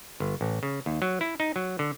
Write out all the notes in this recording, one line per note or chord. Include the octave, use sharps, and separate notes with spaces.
G1
A1
C#3
D#2
F#3
E4
D#4
F#3
D3